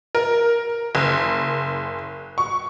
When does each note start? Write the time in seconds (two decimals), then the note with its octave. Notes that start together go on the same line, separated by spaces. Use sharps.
0.15 A#4
0.95 F#1
2.38 C#6